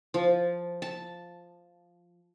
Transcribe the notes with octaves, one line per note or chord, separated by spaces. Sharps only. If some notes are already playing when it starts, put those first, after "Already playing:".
F3
A5